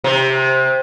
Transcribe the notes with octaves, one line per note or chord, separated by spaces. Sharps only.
C3